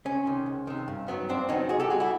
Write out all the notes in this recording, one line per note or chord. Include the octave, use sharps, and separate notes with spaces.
C#2 C#4
C3 D#3
C#2
C3 D#3
G2
D#3 F#3 B3
G2 C4 D4
D#3 F#3 B3 C#4 D#4
C2 F#4 G#4
G4 A4
B2 G3 F#4 G#4
E4 F#4